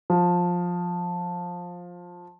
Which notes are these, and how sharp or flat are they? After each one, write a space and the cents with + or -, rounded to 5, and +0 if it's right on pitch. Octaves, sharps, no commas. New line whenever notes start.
F3 +15